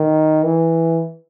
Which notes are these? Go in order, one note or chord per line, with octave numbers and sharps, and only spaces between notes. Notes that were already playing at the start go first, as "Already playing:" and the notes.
Already playing: D#3
E3